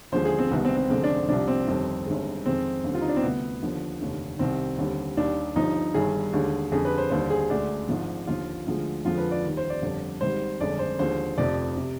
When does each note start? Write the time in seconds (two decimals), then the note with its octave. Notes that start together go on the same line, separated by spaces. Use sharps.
0.12 D#2 D3 F3 G#3 C5
0.25 G#4
0.39 C4
0.51 C2 C3 D#3 G#3 B3
0.65 C4
0.77 C4
0.90 F1 F2 D3 G#3 C4
1.04 D4
1.28 C2 C3 F3 D4
1.48 C4
1.67 G1 F2 D#3 G3
2.06 G1 G2 D#3 G#3
2.46 F2 D#3 G#3 C4
2.84 D#2 D3 G3
2.94 F4
3.01 D#4
3.09 D4
3.16 C4
3.22 D2 C3 G3 B3
3.62 D#2 D3 F3
4.00 F1 D#2 D3
4.39 C2 C3 D#3 C4
4.78 D#2 D3 G3
5.17 D#2 D#3 G3 D4
5.55 G1 G2 F3 D#4
5.94 G1 G2 D#3 G3 G#4
6.33 D#2 D3 G#3
6.72 F2 D3 G3 G#4
6.85 B4
6.98 C5
7.10 D#2 D3 G3 C5
7.30 G#4
7.50 D2 D3 G#3 D4
7.89 G#1 G#2 F3
8.27 D#2 D3 F3 F4
8.66 D2 D3 F3 G#3
9.05 F2 D3 F3 G#3 F4
9.17 B4
9.31 D5
9.44 D#2 D#3 G3
9.57 C5
9.70 D5
9.82 G1 F2 D3 G3
10.21 G#1 G#2 D#3 G3 C5
10.61 G1 F2 D3 G#3 D5
10.79 C5
10.99 D#2 D3 F3 G#3 C5
11.38 F1 F2 C3 F3 D5
11.77 C3